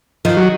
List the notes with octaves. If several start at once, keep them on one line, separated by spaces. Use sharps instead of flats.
D#3 F3
F#3